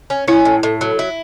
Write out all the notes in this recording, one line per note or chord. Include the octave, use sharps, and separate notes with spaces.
C#4
C#4 E4
A2
A2
F#3
E4